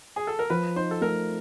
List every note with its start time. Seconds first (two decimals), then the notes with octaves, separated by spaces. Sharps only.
0.16 G#4
0.27 A4
0.39 A#4
0.50 F3 B4
0.76 D#4 C5
0.91 A4
1.01 A3 A#4